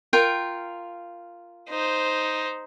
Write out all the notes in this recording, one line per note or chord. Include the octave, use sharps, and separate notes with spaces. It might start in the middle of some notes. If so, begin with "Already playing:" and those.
F4 A#4 G5
D#4 C5